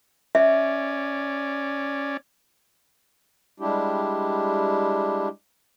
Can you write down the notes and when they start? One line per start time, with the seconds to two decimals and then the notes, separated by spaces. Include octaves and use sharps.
0.35 C#4 D5 E5
3.60 G3 G#3 D4 E4 G4